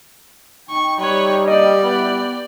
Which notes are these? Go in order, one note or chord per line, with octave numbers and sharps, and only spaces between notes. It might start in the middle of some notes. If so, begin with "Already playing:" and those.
D#4 G5 C#6
G3 B4 C#5
A#3 D4 G4 D5 D#5
B3 E4